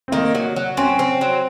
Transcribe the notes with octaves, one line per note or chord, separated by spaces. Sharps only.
C4
D#3 A#3
F#3
F#3
C4 C#4
C4
F#3